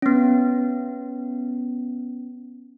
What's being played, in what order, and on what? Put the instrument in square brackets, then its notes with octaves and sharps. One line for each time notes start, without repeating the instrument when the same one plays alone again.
[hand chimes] B3 C#4